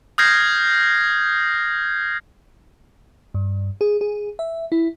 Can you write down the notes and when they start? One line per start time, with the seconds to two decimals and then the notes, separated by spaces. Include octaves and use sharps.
0.18 D#6 F6 G6 G#6 A#6 C7
3.34 G2
3.81 G#4
4.01 G#4
4.39 E5
4.72 E4